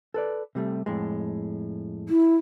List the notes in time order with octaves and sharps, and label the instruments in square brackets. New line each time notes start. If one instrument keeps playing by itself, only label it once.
[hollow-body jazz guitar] A4 B4 D5
C3 G3 A3
F2 A2 G#3
[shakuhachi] E4